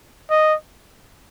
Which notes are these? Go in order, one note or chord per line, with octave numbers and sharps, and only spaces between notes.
D#5